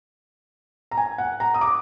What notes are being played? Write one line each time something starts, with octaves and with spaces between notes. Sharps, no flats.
A#5
G#5
F#5
A#5
D#6
D6